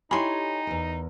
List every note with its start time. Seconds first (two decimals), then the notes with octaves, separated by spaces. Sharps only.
0.11 D#4 E4 G4 A4 C#5 G#5 B5 C6
0.67 E2 A#4